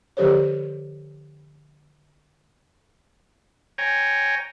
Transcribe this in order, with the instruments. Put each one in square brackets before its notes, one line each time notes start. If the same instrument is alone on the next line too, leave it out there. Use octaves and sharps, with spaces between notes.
[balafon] D3 F3 G4 A4 C5 C#5
[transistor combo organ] C#5 G5 G#5 A#5